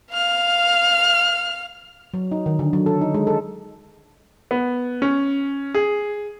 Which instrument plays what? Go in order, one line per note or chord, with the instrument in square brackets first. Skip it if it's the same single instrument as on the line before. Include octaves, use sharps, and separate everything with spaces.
[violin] F5 F6
[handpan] F#3
D#4
D#3
D3
F#3
A4
D#4
G#3
A4
[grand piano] B3
C#4
G#4